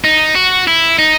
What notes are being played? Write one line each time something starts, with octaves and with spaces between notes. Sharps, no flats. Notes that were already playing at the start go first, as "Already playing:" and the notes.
D#4
F#4
E4
D#4